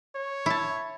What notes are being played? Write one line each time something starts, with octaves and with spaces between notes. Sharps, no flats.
C#5
E4 A5